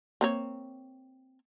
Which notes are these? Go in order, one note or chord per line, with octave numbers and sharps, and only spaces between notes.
A#3 C4 C#5